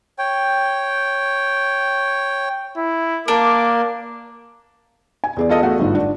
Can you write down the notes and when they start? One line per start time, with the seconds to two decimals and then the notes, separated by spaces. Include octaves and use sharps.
0.18 C#5 G5
2.77 E4
3.28 A#3 D4 A#4 D6
5.24 G#5
5.37 E2 G#4 D5
5.49 F4 A4 D#5
5.63 A3 F#4
5.80 G1 G#2 F4
5.95 D4